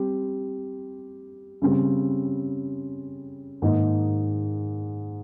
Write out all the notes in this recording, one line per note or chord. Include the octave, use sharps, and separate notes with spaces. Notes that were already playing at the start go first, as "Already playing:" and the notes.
Already playing: G3 C4 G4
C#3 G3 C4
G#2 D#3 A#3 D#4